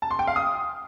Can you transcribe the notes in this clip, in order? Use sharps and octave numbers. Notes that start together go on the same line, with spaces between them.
A5
C6
G5
F5
D#6